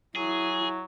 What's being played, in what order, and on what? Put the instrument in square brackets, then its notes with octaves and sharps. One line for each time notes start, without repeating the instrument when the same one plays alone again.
[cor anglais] F#3 [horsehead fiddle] E4 [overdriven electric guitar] G#4